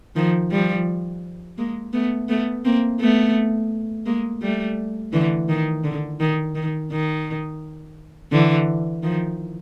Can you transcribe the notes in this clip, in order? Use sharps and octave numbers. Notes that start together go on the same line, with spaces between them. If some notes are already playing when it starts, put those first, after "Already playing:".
D#3 F3
F3 G3
G#3 A#3
A3 B3
A3 B3
A#3 C4
A3 B3
G#3 A#3
G3 A3
D3 E3
D#3
D3
D#3
D#3
D#3
D3 E3
D#3 F3